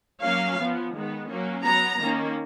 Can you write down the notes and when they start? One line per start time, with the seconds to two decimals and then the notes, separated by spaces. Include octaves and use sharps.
0.23 F#3 A#3 C#4 F5
0.59 F3 B3
0.94 D#3 G#3 B3
1.29 F#3 A#3 C#4
1.64 F#3 B3 A#5
2.00 D#3 A#3 C#4